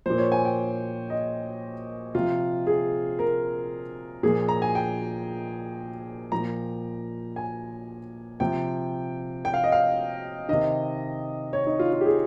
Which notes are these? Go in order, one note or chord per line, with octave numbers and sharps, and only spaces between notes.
A#2 F3 C5
C#5
G#5
G5
D#5
C3 F3 F4
G#4
A#4
A#2 F3 G#4
A#5
G#5
G5
A#2 F3 A#5
G#5
C3 F3 G5
G5
F5
D#5
F5
C3 D#3 D#5
C#5
D#4
F4
F4
G4
G#4